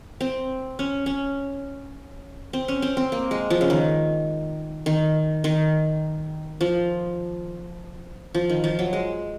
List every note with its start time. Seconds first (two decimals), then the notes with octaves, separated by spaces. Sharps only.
0.21 C4
0.79 C#4
1.06 C#4
2.53 C4
2.68 C#4
2.82 C4
2.97 C4
3.12 A#3
3.31 G#3
3.50 F3
3.61 C#3
3.70 D#3
4.86 D#3
5.44 D#3
6.61 F3
8.35 F3
8.50 D#3
8.64 F3
8.79 F#3
8.93 G#3